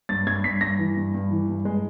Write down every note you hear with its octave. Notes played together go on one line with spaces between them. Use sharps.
G2 A6
G2 G#6
G2 B6
G2 A#6
E3
G2
G2
E3
G2
G#3